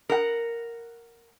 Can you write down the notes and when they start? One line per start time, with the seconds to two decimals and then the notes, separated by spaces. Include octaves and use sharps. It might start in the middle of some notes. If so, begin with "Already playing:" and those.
0.09 A#4 F#5